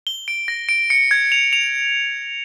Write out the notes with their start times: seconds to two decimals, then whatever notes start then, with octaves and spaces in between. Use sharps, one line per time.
0.07 G7
0.28 D7
0.48 A#6
0.69 D7
0.90 C#7
1.11 G#6
1.32 F7
1.53 F7